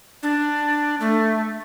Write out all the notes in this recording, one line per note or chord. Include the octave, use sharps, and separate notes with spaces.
D4
A3